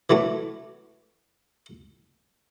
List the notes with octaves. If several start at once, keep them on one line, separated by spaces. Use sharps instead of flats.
E3 F#3 A3 D4